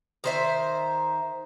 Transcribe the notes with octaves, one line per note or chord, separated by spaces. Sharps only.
D#3 C5 E5